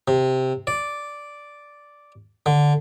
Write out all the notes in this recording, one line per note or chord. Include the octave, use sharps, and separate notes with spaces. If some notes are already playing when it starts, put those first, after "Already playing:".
C3
D5
D3